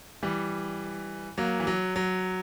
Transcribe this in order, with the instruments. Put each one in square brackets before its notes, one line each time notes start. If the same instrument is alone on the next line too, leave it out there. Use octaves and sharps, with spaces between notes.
[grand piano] E3 G3
F#3 A#3
E3
F#3
F#3